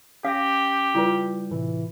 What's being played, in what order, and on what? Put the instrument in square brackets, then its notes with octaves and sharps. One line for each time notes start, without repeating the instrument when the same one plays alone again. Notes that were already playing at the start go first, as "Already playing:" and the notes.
[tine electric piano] C#4 A#6 [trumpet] G4 [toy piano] F5
[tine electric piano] C#3 G3 [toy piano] E4 F4 B4
[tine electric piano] A2 C3 E3